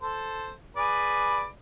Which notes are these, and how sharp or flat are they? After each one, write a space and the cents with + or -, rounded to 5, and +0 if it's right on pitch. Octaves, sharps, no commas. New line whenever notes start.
A4 +0 C5 +0
G#4 +5 B4 +0 D5 +10